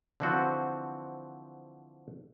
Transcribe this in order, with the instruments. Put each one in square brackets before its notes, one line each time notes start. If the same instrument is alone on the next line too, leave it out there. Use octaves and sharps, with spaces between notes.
[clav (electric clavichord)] D3 E3 F3 C4 F#4 C5